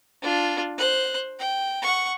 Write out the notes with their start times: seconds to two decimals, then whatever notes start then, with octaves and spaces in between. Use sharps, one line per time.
0.22 D4 F4
0.77 C5 F#6
1.39 G5
1.82 F#5 C#6